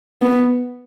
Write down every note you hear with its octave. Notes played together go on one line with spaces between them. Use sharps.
B3